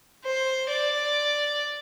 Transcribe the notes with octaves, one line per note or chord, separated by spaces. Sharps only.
C5
D5